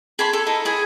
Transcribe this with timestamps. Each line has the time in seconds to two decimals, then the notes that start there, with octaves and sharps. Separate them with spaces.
0.19 G#4 A5 B5 C6
0.33 A4
0.47 D#4 E4 A4
0.65 E4 G#4 G#5